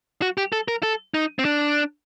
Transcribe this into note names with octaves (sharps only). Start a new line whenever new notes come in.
F#4
G4
A4
A#4
A4
D#4
C4
D4